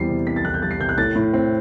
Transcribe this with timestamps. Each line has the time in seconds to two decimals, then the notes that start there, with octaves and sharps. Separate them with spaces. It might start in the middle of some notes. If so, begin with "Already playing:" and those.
Already playing: E2 G3 C4 C7
0.09 C3
0.27 C4 B6
0.36 A6
0.45 E2 F#6
0.54 G6
0.62 G3 A6
0.71 C7
0.80 C3 G6
0.89 F#6
0.98 A2 A6
1.16 A2
1.33 C4